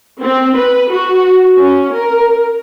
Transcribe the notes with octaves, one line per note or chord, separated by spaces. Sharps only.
C4
B4
F#4
C#4
A#4